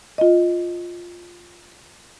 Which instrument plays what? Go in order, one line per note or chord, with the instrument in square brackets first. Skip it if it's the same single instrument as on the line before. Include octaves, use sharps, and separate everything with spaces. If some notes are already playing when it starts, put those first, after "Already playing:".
[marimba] F4 D#5